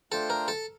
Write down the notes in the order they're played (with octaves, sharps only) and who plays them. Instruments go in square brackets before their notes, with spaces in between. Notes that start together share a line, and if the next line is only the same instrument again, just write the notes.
[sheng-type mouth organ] A3 D4 F4 C5 G5 [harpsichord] A4
[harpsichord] A#4
A4